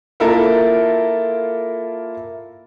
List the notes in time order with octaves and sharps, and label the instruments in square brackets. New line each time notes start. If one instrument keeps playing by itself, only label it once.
[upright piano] A#3 E4 F4 A4 A#4